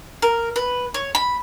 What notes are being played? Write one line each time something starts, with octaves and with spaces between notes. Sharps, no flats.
A#4
B4
C#5
B5